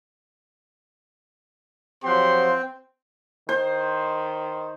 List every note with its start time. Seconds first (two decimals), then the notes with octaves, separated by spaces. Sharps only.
2.04 F3 F#3 C4 G4 F#5 C6
3.49 D#3 C5